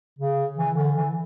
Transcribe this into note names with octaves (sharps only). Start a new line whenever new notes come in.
C#3
E3
D3
E3